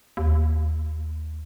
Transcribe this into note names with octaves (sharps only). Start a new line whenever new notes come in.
D#2